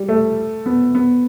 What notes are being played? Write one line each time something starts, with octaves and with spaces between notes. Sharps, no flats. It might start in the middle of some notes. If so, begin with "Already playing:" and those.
Already playing: G3
A3
B3
B3